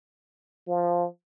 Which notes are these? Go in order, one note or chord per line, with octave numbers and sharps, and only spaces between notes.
F3